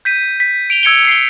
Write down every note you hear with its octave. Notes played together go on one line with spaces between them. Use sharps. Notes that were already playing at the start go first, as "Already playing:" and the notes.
G6 B6 D#7
B6
D7 F7 G7
E6 G#6 C#7 D7 G7
C7 D7 G7